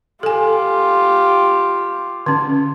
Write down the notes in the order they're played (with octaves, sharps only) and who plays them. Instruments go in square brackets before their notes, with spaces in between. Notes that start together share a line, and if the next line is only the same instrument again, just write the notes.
[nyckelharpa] F4 G4 [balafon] A4 G#5
[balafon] D3 C#4